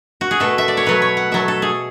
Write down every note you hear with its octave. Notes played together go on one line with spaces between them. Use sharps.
F#4
G#4
B2 A3 A4
E5
D5
C#5
B2 F#3 A3 B4
C#5
F#5
B2 F#3 A3 E5
A4
G#4